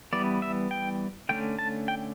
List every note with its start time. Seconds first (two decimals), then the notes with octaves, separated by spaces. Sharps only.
0.13 E3 G3 B3 D5
0.42 E5
0.71 G5
1.29 D3 A3 C#4 G5
1.59 A5
1.88 G5